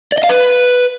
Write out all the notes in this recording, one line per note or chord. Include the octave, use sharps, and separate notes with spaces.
D5
D#5
F5
B4